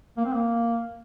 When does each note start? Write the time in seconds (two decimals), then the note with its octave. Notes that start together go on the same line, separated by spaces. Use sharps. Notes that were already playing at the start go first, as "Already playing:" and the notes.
0.17 A#3
0.25 C4
0.32 A#3